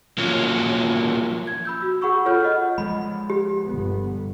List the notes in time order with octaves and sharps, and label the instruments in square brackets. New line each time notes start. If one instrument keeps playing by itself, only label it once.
[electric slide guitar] F3 F#3 A#3 C#4
[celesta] G#6
B5 E6 G6
F#4 E6
G#4 F#5 B5 C#6 E6
F4 A4 C#5 F6 G6
D#5 F#5 F6
[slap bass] F3 G#3 [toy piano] B5
[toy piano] G4
[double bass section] G1 B3